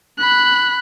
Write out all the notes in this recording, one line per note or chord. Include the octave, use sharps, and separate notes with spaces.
B5 F#6